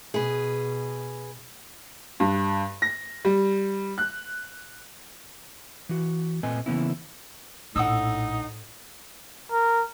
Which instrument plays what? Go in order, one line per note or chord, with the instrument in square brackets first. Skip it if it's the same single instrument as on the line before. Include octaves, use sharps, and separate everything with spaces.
[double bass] B2 [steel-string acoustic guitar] G#4 B4
[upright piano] G2
A#6
G3
F#6
[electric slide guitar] E3 F#4
A#2 A3 C4 B4 D#5 G#5
C#3 E3 A#3 B3 C#4 E4
[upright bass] A#1 [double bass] A2 [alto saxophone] D#4 [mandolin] F#5 D#6 E6
[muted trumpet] A#4